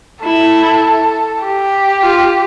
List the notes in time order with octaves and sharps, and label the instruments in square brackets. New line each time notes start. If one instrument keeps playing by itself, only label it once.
[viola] E4 [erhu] A4
[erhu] G4
[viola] F4